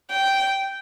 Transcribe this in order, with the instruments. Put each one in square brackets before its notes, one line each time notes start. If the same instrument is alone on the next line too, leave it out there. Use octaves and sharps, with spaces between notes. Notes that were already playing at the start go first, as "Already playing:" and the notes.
[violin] G5